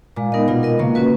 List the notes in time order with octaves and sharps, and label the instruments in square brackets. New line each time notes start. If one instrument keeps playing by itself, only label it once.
[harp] A#2 [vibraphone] G#3
[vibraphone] B3 D#4 A#4 D#5
[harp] B2 [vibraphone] F4
[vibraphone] A#4 D#5
[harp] C#3 [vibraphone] A#3
[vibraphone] C#4 F#4 B4